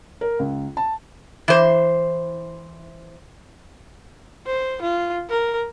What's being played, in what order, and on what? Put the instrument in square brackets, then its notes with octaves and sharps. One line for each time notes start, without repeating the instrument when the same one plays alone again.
[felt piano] A#4
C#2
A5
[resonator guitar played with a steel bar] E3 C5
[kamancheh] C5
F4
A#4